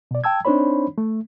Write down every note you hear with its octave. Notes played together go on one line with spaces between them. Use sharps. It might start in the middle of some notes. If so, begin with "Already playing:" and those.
B2 D5
G5 A5 E6 G#6
C4 D4 D#4 C5 C#5 B5
A3